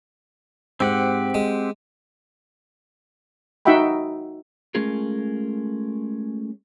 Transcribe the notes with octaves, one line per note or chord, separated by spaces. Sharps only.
G#2 C4 G4 F#5
G#3
D#4 F#4 E5 F#5 G5 B5
G#3 A3 C#4 F4 G#4 A#4